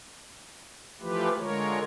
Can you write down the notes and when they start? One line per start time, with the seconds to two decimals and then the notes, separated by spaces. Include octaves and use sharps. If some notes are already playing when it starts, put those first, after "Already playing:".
1.01 E3 F3 A3 F4 G4 B4
1.38 D3 G#3 F4 A#4 C#5